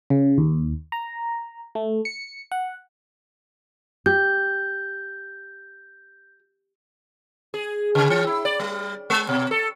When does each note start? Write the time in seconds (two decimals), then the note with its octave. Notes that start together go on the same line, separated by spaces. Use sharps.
0.10 C#3
0.38 D#2
0.92 A#5
1.75 A3
2.05 C#7
2.52 F#5
4.06 G4 G6
7.54 G#4
7.95 C#3
8.10 E3
8.27 E4
8.45 D5
8.60 G3
9.10 G#3
9.29 B2
9.51 A4